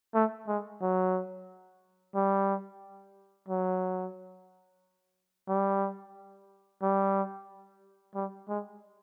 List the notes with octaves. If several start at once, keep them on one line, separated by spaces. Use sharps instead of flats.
A3
G#3
F#3
G3
F#3
G3
G3
G3
G#3